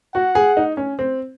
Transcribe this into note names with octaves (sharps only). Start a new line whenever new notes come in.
F#4 F#5
G#4
D#4
C#4
C4